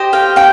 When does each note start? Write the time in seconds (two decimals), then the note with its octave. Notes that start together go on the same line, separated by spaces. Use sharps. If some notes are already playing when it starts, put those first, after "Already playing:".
Already playing: G4 C5 D#5
0.13 F5 G5
0.36 F5 G5